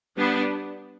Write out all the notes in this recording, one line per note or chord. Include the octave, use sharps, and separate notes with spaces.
G3 B3 D4